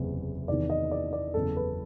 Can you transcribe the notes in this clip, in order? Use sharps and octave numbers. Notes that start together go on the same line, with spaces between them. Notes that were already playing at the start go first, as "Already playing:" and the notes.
Already playing: F#1 E2 C3
E2 C3 D#3 D5
D#5
D5
D5
F#1 E2 C#3 A4
B4